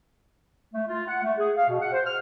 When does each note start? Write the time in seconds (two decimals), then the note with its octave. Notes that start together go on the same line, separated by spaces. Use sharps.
0.74 A3
0.87 F4
1.07 F#5
1.23 A3
1.37 G#4
1.57 F5
1.69 B2
1.80 F#5
1.92 C5
2.06 F6